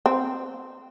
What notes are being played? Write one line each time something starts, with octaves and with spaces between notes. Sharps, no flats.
C4